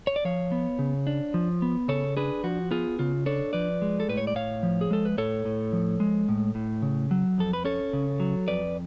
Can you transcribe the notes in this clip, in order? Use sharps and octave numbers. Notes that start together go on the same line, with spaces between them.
C#5
D5
F3 C#5 F5
B3
C#3
D4
F3
B3
C#3 A4 C#5
D4 G#4 B4
F3 F#4
B3 F4 G#4
C#3 F4
D4 A4 C#5
F3 B4 D5
G#3
A4
A2 B4
C#5
D5
A2 C#5 F5
F3
G#4
G#3 A4
B4
A2 A4 C#5
A2
F3
G#3
A2
A2
C#3
F#3
F2 A4
B4
C#4 A4 C#5
C#3
F#3
F2 B4 D5